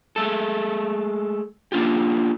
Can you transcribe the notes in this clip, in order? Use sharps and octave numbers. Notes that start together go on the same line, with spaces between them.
G#3 A3 A4
A#3 D4 F4 G4